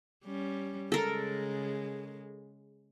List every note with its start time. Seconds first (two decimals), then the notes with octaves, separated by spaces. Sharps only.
0.24 G3 C#4
0.92 C#3 G#3 A4 A#4